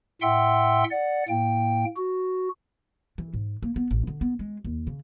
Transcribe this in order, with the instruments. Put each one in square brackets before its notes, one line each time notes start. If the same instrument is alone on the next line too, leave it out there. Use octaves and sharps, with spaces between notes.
[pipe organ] A2 E5 F#5 G5 C6 E6
D5 F#5
A2 A#3 G5
F#4
[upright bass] E3
G#2
A#3
B3
A1
D3
B3
G#3
D#2
C#3